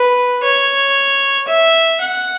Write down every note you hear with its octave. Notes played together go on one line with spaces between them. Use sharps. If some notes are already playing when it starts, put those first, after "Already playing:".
Already playing: B4
C#5
E5
F#5